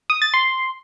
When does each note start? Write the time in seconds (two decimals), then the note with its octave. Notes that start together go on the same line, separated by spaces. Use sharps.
0.10 D#6
0.22 A6
0.34 C6